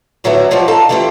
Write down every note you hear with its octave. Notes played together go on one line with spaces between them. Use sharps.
A2 D3 F#3 B3 E4 F#4
B2 F3 G3 F4 F#4
D#4 A4 F5 A5
D3 E3 A3 E4 F4 G4